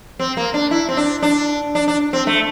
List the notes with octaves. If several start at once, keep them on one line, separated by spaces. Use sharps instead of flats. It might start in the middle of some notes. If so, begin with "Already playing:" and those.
C4
A#3
D4
E4
C4
D4
D4
D4
D4
C4
A3